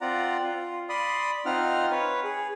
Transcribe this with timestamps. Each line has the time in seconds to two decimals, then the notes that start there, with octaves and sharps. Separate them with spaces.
0.01 C4 F4 D5 F#5 A#5
0.44 F4
0.89 D5 B5 C6 D#6
1.46 C4 D#4 F4 F#5 F6
1.91 B4 C#5
2.24 G#4